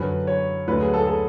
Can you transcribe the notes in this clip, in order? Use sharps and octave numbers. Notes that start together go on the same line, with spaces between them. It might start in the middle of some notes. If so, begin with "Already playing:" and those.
Already playing: F#2 D3 F#3 B4
C#5
D2 D3 F#3 B4
G#4
A4
G#4
A4